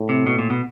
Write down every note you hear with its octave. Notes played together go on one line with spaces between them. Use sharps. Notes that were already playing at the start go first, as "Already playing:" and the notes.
Already playing: A2
C3
B2
A#2
B2